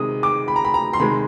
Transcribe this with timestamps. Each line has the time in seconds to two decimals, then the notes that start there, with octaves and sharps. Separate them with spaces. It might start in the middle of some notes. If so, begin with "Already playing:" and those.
Already playing: C3 D#3 G#3 D#6
0.23 D6
0.48 B5
0.56 A#5
0.65 B5
0.74 A#5
0.93 C6
1.00 C3 D#3 G#3 B5